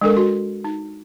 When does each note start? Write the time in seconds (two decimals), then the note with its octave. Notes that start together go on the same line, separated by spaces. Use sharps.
0.01 G#3 D4 A4 A#4
0.17 F#4
0.64 D#4